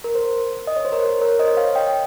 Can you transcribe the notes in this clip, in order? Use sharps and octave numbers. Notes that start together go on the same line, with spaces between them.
A#4
C5
D#5
C#5
C5
A#4 C#5
A#4 C#5
C5 D#5
C#5 F5
D#5 G5